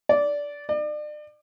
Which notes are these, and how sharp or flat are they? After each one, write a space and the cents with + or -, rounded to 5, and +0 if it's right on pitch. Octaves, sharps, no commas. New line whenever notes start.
D5 -15
D5 +35